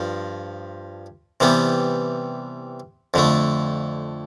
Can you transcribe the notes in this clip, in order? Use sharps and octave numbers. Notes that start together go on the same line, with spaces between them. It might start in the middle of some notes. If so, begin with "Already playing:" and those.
Already playing: G2 F3
C3 E3 G3 B3
F2 D3 A3